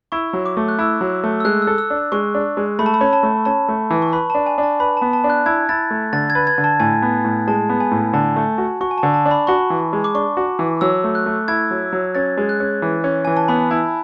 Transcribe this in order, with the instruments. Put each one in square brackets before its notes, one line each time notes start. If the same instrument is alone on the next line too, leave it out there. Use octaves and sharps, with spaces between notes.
[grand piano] E4 [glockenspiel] C#6
[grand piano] F#3
[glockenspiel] D6
[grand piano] A3
[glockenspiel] F#6
[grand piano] E4 [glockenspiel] E6
[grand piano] F#3
A3
[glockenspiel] E6
[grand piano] G#3 [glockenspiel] F#6
[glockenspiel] E6
[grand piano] A4
[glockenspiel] E6
[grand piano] D4
[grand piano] G#3 [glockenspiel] C#6
[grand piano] D4
G#3
[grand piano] A3 [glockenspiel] B5
[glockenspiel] A5
B5
[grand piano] C#4
[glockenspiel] A5
[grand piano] A3
[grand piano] C#4 [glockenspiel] A5
[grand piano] A3
E3
[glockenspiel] C#6
[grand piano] B4 [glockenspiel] B5
[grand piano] D4 [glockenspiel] A5
[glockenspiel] G#5
[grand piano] D4
[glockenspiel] A5
[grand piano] B4 [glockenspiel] B5
[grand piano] B3 [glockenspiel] A5
[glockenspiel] A5
[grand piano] D4
[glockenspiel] F#6
[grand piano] E4 [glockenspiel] G#6
[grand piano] E4 [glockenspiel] A6
[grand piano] A3
[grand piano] D3 [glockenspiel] A6
[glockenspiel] G#6
[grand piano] B4
[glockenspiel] G#6
[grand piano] D3
[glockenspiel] A5
[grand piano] A2 [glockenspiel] G#5
[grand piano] B3
A2
[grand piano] G#3 [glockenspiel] A5
[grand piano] B3
[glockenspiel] G#5
[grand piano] A2
[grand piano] D3 [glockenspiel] A5
[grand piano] A3
F#4
[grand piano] F#4 [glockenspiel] C#6
[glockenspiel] G#5
A5
[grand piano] D3
[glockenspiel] A5
[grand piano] D4
[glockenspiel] B5
[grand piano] F#4 [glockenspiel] C#6
[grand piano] E3
G#3
[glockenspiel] D6
[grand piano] D4 [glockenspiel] C#6
[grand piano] F#4
E3
[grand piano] F#3 [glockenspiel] E6
[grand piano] A3
[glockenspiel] F#6
[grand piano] A3
[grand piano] E4 [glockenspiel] G#6
[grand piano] F#3
F#3
[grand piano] C#4 [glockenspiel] A6
[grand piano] G#3
[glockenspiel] F#6
[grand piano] C#4
E3
C#4
[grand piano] E3 [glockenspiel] G#5
[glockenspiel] A5
[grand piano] B3 [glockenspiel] B5
[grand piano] E4